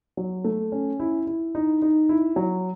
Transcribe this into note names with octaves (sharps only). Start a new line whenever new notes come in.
F#3
A3
C#4
E4
E4
D#4
D#4
E4
F#3